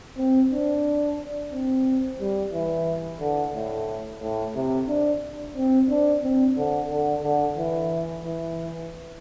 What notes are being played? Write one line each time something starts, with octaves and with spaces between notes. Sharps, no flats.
C4
D4
C4
G3
E3
D3
A2
A2
C3
D4
C4
D4
C4
D3
D3
D3
E3
E3